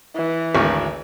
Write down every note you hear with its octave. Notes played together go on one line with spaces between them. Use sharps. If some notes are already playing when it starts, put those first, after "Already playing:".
E3
G#1 D2 C#6